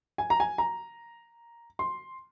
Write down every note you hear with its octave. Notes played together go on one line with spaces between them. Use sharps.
G#5
A#5
G#5
A#5
C6